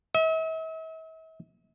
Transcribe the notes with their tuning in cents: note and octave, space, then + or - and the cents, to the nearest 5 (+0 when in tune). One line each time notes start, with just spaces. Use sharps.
E5 -45